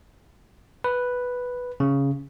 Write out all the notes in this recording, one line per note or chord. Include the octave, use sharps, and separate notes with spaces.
B4
C#3